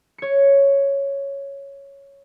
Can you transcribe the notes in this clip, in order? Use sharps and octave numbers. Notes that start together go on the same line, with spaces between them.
C#5 C#7